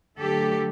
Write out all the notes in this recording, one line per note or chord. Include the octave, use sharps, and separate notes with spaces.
D3 F#3 A3 G4 A4